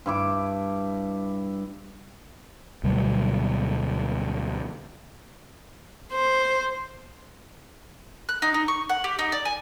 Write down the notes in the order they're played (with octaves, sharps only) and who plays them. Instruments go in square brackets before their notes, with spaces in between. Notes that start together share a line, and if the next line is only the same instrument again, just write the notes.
[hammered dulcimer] G2 E4 D6
[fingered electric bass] D2 B2 F#3 G3
[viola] C5
[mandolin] F#6
D#4
D#4
C#6
F#5
G4
D#4
D5
G#5